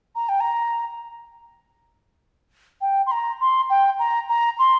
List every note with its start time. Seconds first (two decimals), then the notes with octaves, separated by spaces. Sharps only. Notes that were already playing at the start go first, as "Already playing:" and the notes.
0.15 A#5
0.28 G5
0.40 A#5
2.81 G5
3.06 C6
3.11 A#5
3.40 C6
3.70 G5
3.99 A#5
4.29 A#5
4.59 C6